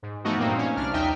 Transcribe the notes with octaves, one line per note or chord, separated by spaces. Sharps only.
G#2
E3 F3 A3 B3 D#4 F#4
G2 A#2 A#3 C4 D#4
C#4
C2 D4 F6
A#1 D#2 D#4 E5 G5 F6